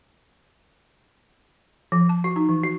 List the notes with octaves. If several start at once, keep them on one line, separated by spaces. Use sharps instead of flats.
F3
A5
F#4
D#4
E3
F#4